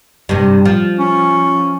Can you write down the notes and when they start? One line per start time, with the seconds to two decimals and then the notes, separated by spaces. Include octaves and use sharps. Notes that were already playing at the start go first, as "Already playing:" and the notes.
0.29 G2 C3
0.65 F3
0.99 C#4